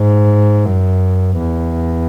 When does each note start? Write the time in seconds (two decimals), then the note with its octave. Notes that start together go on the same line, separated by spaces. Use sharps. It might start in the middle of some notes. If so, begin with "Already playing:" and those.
Already playing: G#2
0.66 F#2
1.38 E2